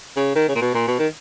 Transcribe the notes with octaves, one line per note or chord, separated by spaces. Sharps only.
C#3
D#3
C#3
A#2
B2
A#2
B2
D#3